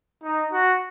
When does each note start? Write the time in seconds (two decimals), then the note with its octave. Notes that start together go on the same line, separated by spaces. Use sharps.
0.23 D#4
0.52 F#4